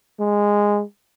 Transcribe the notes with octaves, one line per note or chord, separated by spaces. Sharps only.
G#3